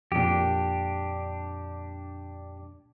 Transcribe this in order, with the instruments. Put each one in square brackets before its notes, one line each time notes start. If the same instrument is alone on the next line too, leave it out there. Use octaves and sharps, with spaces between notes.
[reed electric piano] F2 A#2 [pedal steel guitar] D4 G4